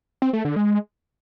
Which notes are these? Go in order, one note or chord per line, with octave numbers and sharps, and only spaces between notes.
C4
A3
D3
G#3